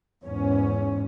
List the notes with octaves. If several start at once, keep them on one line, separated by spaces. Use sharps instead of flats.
E2 G#2 C#4